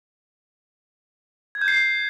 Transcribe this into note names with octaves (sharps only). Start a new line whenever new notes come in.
G#6
G6
C7